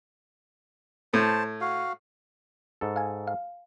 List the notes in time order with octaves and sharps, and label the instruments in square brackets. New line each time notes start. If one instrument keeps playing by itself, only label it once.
[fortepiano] A2 [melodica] C5 A5
[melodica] F#4 F5
[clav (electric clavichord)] G#2 A4
[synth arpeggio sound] F5 G#5
F5